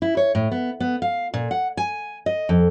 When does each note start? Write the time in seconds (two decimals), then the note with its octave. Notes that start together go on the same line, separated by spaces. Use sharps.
0.02 E4
0.17 C#5
0.35 A2
0.51 B3
0.80 B3
1.02 F5
1.34 A#2
1.51 F#5
1.77 G#5
2.26 D#5
2.49 F2